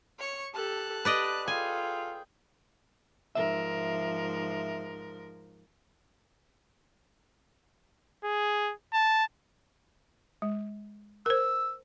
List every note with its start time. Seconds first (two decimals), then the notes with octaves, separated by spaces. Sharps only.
0.19 C#5 C#6
0.54 G4 A4 A5 F#6
1.05 G4 B4 D5 D#5
1.48 F4 G#4 A4 G5 G#5
3.35 G#2 F3 A#4 E5
8.24 G#4
8.93 A5
10.42 G#3
11.26 A#4 C5 E6